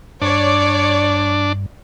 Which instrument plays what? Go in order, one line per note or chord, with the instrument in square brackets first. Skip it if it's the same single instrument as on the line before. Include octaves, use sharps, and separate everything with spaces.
[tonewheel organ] G2 [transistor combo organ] D4 [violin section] C#5 D5